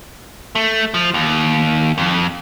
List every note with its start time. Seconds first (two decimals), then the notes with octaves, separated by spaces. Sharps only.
0.55 A3
0.94 F3
1.14 D#2
1.98 F2